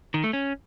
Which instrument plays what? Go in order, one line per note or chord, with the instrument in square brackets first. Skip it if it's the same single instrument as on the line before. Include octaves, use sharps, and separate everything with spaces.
[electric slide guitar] D#3
A3
C#4